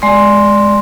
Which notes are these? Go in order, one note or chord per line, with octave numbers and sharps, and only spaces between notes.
G#3 D5 G#5 C6